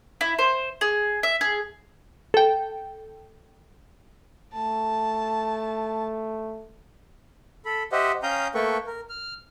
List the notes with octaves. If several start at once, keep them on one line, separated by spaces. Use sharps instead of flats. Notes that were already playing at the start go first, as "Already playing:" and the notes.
E4
C5
G#4
E5
G#4
A4 G5
A3 A5
A4 B5
G4 C5 D#5 E5 F#5
C#4 F5 G5 A#5 D#6 G6
A3 A#3 A4 B4 G5 C#6
A#4
F6